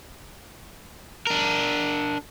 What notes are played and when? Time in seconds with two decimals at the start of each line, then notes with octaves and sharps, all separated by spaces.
1.27 D4 A#4